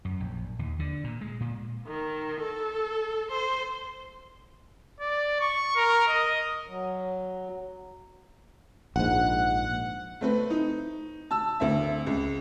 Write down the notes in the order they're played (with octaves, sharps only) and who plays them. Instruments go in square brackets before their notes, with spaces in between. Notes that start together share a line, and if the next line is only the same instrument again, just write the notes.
[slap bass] F#2
A#1
D#2
D3
A#2
G#3
A#2
[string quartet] D#3
A4
C5
[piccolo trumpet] D5
C#6
A#4
D#5
[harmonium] F#3
[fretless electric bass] A#1 G#2 [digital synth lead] F#5
[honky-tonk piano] A3 C4 B4
D#4
A5 E6
D2 C4 E5
C#2